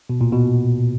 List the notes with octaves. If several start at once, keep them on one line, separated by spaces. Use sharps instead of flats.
B2
A#2
B2